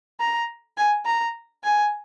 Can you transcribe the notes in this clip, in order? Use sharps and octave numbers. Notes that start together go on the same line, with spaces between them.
A#5
G#5
A#5
G#5